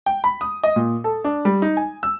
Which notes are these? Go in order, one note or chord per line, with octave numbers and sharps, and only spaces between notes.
G5
B5
D#6
D#5
A#2
A4
D4
G3
D#4
G#5
E6